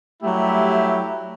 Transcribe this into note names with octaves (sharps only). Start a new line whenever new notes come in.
F#3 G3 A3 E4 G4